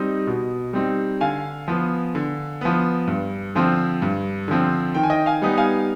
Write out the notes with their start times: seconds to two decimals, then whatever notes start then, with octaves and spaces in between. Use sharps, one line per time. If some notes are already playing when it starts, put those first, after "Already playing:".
Already playing: G3 C4 D#4 D#5
0.27 B2
0.73 G3 C4 D#4
1.21 D3 F5 G#5
1.68 F3 B3
2.15 D3
2.61 F3 B3
3.07 G2
3.55 D3 F3 C4
4.02 G2
4.48 D3 F3 C4
4.94 D#3 G5
5.03 G#5
5.10 D#5 G5
5.26 F5 G#5
5.42 G3 B3 D#4
5.57 F5 G#5